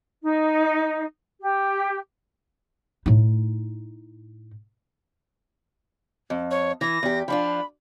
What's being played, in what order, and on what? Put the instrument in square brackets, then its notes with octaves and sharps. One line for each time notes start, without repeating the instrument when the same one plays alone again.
[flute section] D#4
G4
[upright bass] A2 D#4
[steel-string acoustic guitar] F2
[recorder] C#5
[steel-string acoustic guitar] E3 [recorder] A#6
[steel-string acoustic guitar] E2 G4
[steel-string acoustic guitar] F3 D4 F4 [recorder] B5